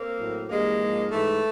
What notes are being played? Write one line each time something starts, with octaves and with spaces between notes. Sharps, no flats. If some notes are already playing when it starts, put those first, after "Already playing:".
Already playing: A#3 C4
A2 F#3
G2 E3 G#3 A#3
G#2 F3
G#2 E3 A3